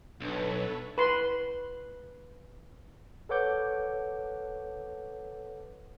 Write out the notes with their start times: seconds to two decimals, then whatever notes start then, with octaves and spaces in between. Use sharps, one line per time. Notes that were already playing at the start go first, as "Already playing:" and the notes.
0.21 B1 D4 A4 B4 C#5
0.98 B4 C6
3.29 A4 B4 C#5 F#5 D6 G6